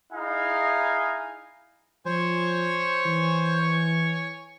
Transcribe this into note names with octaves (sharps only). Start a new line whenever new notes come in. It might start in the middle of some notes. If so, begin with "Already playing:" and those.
D#4 E4 G#4 F5 G#5
F3 C5 C#5 G#5 C#6
E3